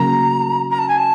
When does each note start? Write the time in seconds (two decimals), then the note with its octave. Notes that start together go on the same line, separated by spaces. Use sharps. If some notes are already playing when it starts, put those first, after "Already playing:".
Already playing: C#3 F#3 A#3 A#5
0.70 A#5
0.79 A5
0.88 G#5
0.98 A5